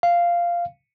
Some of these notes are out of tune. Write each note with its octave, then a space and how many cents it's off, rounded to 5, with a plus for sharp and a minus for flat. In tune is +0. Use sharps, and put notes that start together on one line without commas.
F5 -10